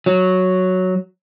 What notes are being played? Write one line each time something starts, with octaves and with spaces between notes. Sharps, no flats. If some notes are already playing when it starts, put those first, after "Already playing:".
F#3